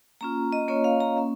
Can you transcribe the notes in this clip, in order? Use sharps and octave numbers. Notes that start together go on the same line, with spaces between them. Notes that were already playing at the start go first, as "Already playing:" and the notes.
A#3 C#4 F4 A#5
D#5
A#3 C#4 F4 C#5
F5
A#5
A#3 C#4